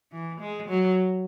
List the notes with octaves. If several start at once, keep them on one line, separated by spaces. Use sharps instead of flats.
E3
G#3
F#3